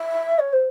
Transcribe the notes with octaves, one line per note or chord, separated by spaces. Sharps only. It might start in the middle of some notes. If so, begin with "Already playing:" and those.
Already playing: E5
C#5
C5